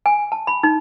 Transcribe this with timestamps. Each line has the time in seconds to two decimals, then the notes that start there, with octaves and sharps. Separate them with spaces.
0.06 G#5
0.32 A5
0.47 B5
0.63 D#4